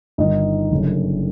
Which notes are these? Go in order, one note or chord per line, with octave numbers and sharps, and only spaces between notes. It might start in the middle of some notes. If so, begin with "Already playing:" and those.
G1 G2 D#3 D#4 D#5
F#1 F#2 D3